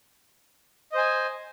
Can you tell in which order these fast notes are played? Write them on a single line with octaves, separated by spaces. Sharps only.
D#5 C5 G#5